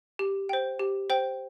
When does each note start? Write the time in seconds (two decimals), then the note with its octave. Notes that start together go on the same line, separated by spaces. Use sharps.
0.19 G4
0.49 C5 G5
0.79 G4
1.10 C5 G5